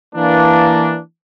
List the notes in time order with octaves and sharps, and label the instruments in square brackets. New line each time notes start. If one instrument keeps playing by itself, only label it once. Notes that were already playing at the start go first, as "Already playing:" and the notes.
[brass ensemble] E3 A#3 D4